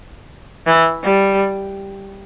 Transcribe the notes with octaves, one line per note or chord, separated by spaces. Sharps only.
E3
G3